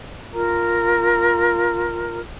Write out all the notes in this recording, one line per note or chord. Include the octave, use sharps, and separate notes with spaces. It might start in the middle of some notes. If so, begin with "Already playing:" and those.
F4 A#4 A#5